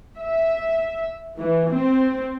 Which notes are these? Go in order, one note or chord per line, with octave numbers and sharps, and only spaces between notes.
E5
E3
C4